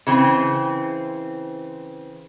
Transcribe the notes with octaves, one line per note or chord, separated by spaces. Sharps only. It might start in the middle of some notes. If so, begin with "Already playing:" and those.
C#3 E3 C4